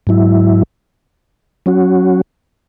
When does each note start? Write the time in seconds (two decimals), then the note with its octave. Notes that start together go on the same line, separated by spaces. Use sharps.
0.07 G#2 F#3 E4
1.66 F#3 C#4 F#4